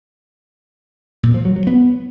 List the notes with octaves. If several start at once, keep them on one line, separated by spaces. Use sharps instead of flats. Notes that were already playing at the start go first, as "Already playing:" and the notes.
A#2
F3
F#3
F#3
B3